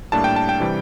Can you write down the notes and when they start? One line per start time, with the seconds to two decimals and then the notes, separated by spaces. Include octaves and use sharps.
0.12 A2 G3 A#3 D4 A5
0.24 G5
0.36 A5
0.49 G5
0.60 C3 E3 G3